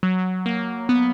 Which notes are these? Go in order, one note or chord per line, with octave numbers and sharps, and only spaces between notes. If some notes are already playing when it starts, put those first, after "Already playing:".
F#3
A#3
B3